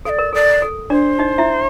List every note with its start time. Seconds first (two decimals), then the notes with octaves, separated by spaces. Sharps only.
0.05 A4 F5
0.09 D5
0.19 A#4
0.33 A4 D5
0.62 A4
0.90 D4 C5 D5
1.19 D#4 D#5
1.38 E4 E5